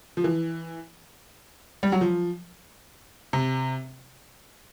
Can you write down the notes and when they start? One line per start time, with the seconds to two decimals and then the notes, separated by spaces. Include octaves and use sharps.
0.17 F3
0.24 E3
1.83 G3
1.92 F#3
2.01 F3
3.33 C3